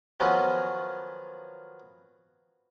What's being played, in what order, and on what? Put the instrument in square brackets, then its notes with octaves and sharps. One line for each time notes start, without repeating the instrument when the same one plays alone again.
[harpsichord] D#3 F3 F#3 B3 C#4